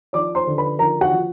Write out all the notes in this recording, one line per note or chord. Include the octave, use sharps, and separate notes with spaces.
F3 D5 D6
C5 C6
D3
B4 B5
F3 A#4 A#5
F#4 F#5
F3